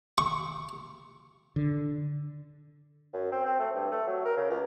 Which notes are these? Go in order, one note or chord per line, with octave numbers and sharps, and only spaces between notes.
C#6
D3
F#2
C4
C4
A3
G2
A3
F#3
A#4
C#3
C#2